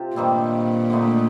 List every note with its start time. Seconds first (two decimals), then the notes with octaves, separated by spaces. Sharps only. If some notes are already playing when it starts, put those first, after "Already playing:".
Already playing: C3 F4
0.16 G2 A#2 D#3 G3 C4
0.90 D3 A3 D#4